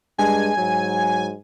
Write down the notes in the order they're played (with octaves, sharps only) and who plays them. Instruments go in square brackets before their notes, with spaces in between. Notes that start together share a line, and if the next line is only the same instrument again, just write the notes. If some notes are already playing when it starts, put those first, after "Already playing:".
[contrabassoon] G2 [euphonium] G#3 [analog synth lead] G#5
[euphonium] G#2 [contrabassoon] F#3